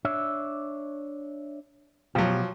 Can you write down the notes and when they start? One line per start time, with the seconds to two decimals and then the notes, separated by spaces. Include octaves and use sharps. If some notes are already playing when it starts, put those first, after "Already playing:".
0.05 D4 C#5 E5
2.15 B2 F3 F#3 G4